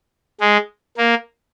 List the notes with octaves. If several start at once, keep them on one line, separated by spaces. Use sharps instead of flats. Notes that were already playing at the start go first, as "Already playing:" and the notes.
G#3
A#3